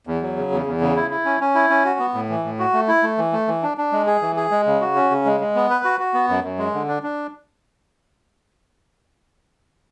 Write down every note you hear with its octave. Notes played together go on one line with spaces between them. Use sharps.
E2
F#3
C#3
E2
E2
C#3
E4
E4
C#4
C#4
E4
C#4
F#4
B3
A2
E3
A2
F#4
A3
E4
A3
E3
A3
E3
D4
D4
G#3
G#4
E3
G#4
G#3
C#3
F#4
C#4
C#3
G#3
G#3
B3
B4
F#4
F#4
B3
F#2
F#2
G#3
D3
D4
D4